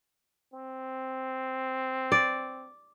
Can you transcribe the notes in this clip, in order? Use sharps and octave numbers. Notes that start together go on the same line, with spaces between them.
C4
D5